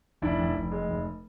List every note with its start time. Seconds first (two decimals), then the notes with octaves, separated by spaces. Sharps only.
0.22 F1 D4 E4
0.39 F1
0.56 F1
0.71 G#3
0.89 F1